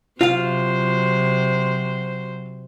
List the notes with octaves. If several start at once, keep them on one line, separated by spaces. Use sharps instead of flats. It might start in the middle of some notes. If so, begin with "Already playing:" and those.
C3 F#3 F4 C5 F5